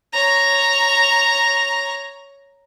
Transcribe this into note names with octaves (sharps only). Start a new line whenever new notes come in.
C#5 A#5